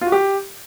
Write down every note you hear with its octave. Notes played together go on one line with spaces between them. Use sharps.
F4
F#4
G4